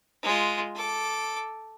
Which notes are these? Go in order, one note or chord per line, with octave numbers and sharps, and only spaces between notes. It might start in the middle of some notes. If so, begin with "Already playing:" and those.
G#3 F4
A4 D6